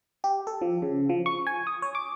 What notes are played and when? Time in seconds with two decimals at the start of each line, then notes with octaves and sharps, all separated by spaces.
0.24 G4
0.47 A4
0.62 F3
0.82 C#3
1.09 F3
1.26 C#6
1.47 G#5
1.67 D#6
1.82 C#5
1.95 D6